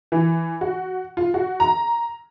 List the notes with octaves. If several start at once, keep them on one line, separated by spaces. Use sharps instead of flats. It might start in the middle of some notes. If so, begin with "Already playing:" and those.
E3
F#4
F4
F#4
A#5